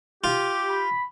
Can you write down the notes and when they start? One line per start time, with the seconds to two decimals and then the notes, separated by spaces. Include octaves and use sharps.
0.24 F4 G4
0.70 B5